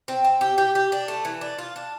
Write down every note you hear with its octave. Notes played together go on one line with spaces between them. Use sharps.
C4
C4
G4
G4
G4
D4
A3
E3
D4
F4
D4